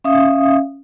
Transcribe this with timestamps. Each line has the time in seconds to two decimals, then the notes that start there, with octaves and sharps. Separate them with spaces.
0.04 C#4 E5 F5 D#6